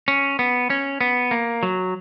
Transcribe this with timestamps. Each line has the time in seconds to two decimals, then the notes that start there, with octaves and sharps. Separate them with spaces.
0.08 C#4
0.39 B3
0.70 C#4
1.01 B3
1.31 A#3
1.63 F#3